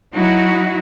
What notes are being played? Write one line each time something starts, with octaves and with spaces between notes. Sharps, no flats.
F#3 D#4 E4 F#4